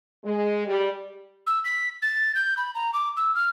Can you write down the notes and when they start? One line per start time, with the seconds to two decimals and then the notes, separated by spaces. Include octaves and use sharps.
0.24 G#3
0.66 G3
1.47 E6
1.65 B6
2.02 A6
2.35 G6
2.57 B5
2.75 A#5
2.94 D6
3.17 E6
3.35 F6